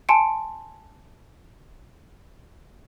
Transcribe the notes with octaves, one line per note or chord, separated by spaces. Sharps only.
G#5 A5 C6 C#7 D7